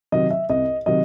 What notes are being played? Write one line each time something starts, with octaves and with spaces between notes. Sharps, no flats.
C3 D#3 F#3 D#5
E5
C2 D#5
C3 D#3 F#3 D#5